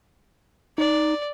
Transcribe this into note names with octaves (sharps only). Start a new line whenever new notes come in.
D#4 D5